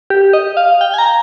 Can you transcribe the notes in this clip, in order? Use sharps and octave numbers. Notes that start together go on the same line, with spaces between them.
G4
D#5
F5
G5
G#5
A#5